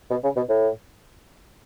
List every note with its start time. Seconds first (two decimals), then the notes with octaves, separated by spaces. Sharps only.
0.10 B2
0.24 C#3
0.36 B2
0.49 A2